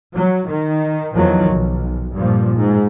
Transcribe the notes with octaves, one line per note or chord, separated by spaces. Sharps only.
F#3
D#3
E2 D#3 F3 F#3
B1
G2 A#2 F3
G#2